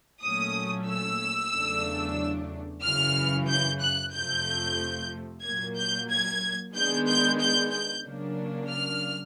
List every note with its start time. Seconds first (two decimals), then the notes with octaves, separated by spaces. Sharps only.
0.23 A#2 F#3 A3 C#4 D#6
0.88 E6
1.54 E2 C#3 F#3 A3 D4
2.84 F#2 C#3 E3 F6
3.49 G6
3.82 F#6
4.14 F2 C3 F3 A3 G6
5.44 A#2 F#3 A#3 G#6
5.78 G6
6.10 G#6
6.75 D#3 G#3 B3 D4 G6
7.08 G6
7.41 G6
7.73 G6
8.05 C#3 F#3 A#3 D4
8.70 F6